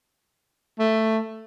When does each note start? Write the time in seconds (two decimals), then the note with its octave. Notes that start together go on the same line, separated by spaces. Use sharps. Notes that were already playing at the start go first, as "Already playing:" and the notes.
0.79 A3